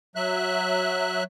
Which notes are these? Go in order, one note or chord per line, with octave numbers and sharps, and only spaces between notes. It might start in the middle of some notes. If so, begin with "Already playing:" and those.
F#3 E5 F#6